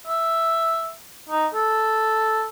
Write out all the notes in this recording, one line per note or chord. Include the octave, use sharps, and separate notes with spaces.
E5
D#4
A4